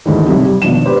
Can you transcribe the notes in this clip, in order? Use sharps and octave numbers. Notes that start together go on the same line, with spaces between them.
D#2 G#2 D3 E3
B1 C3
G3
G#1 B2 F3 D4 E7
G4 B4 C5